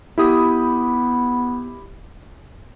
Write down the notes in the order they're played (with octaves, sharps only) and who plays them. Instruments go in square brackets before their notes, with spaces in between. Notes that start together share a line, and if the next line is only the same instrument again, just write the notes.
[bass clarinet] B3 [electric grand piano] E4 G4 D#6